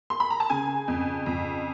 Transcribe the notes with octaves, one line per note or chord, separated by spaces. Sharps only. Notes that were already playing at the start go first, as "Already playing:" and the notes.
C6
B5
A#5
A5
C#3 G#5
F2
F2